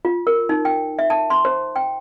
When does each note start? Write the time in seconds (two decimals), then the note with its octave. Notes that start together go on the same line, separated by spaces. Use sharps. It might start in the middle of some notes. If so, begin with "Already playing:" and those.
0.05 F4
0.27 A#4
0.49 D#4
0.65 G5
0.99 E5
1.10 A5
1.30 C6
1.45 C5
1.76 G5